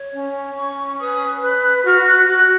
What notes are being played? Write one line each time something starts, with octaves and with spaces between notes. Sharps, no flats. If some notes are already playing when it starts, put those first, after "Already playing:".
Already playing: C#5
C#4
C#4 C#6
B4 D#6
B4 F#6
F#4 F6
F#6
F#4 F#6